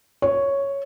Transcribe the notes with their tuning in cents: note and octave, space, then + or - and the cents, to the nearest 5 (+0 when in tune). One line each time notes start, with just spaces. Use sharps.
C#5 +0